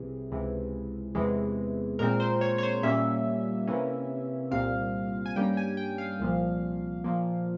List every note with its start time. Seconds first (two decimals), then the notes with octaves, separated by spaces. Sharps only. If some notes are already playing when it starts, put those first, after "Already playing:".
Already playing: C2 C3 E3 G#4
0.31 C#2 C3 E3
1.15 E2 C3 E3 G#3
1.99 A#2 G#3 C4 A#4
2.20 C5
2.41 C#5
2.58 C#5
2.63 C5
2.83 A#2 G3 A#3 C#4 E5
3.67 C3 E3 A#3 C#4
4.51 C2 A#2 G3 C4 F5
5.26 G#5
5.36 G2 G3 A#3 C#4 G5
5.57 G#5
5.77 G5
5.98 F5
6.19 C2 A#2 F3
7.04 A#2 F3 A#3